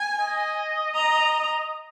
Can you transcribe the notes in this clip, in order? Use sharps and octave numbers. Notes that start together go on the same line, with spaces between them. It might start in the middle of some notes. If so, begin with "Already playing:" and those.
Already playing: G#5
D#5
A#5